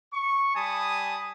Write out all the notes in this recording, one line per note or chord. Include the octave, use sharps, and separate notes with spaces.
C#6
G3 G#5 A5 B5 D#6